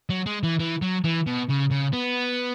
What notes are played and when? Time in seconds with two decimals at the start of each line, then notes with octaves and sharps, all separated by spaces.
0.09 F#3
0.26 G#3
0.43 E3
0.60 E3
0.82 F#3
1.04 E3
1.26 B2
1.49 C#3
1.71 C#3
1.93 B3